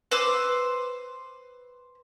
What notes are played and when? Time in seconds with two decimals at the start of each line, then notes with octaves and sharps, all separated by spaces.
0.11 B4 C5 D6 E6